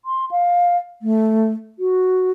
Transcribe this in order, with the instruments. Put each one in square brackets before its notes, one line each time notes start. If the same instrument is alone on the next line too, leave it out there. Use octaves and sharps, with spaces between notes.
[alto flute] C6
F5
A3
F#4